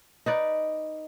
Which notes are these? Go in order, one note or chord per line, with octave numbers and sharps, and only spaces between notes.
D#4 B4 D5